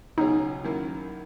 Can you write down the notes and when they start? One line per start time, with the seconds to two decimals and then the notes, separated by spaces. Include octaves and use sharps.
0.18 C#2 B2 F#3 C#4 D#4 G#4
0.64 F#2 D#3 A#3 E4